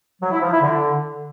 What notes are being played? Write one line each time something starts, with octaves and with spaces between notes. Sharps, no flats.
F#3
E4
F3
E4
D3